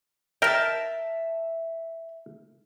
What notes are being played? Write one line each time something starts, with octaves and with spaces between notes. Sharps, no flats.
A#4 E5 G5 A5